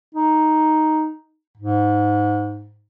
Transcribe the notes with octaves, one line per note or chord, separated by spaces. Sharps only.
D#4
G#2